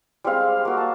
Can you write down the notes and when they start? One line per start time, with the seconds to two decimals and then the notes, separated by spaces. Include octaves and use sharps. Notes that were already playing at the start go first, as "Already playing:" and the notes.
0.24 G3 G#3 C4 F5
0.65 A#3 F#4
0.77 A5